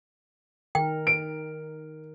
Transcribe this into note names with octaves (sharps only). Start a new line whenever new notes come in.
D#3 A#4 G5
D7